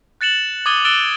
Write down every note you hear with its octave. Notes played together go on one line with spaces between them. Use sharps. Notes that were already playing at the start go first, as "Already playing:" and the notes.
F#6 A6 C#7 E7 F#7
D6 D#6 G#6 A6 D#7 G7
E6 F#6 A6 D7 E7 G7